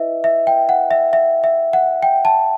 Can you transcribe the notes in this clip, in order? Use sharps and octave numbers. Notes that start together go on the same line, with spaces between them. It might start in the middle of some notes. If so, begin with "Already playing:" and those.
Already playing: E4 B4 D#5 E5
E5
G5
F#5
E5
E5
E5
F#5
G5
A5